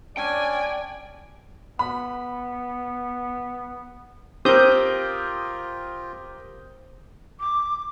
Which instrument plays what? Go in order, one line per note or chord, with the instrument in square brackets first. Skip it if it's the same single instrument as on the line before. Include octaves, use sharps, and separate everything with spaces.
[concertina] C#4 D4 [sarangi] D5 [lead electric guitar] G5 [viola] G#5
[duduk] B3 [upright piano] B5
[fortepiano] C4 [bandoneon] F4 [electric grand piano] G4 A#4 [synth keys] D#6 G6
[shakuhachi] D6